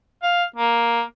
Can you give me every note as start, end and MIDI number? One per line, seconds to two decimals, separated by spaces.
0.23 0.44 77
0.56 1.02 58